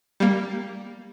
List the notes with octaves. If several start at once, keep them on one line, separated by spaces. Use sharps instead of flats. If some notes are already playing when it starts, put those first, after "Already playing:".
G3 A#3